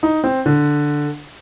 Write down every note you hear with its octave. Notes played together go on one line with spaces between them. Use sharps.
D#4
C4
D3